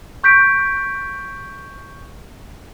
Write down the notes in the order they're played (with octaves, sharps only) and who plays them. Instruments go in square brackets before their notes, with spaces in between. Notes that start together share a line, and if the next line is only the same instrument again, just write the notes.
[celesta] C#6 G6 B6 D7